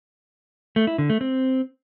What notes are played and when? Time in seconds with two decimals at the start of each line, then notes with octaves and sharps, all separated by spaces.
0.76 A3
0.87 E4
0.98 D3
1.10 A3
1.21 C4